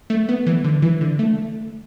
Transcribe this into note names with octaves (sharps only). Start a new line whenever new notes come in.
A3
B3
E3
D3
E3
D3
A3